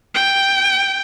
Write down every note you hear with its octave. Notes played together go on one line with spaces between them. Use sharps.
G5